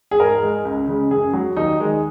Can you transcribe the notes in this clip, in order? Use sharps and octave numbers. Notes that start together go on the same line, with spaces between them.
G#4
G#2 A#4
G#3
C#2
C#3 G#3
F#2 G#4
F#3
D#2 D#4
D#3 G#3